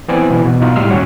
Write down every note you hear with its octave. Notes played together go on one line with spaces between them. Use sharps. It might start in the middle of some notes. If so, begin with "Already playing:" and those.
E3 B3 C4 D5 G#5
B2 E3
B2 F#4
B2 D#4 F4
A2 G3 C6 E6 F6
D#2 C#4 F#4 C#5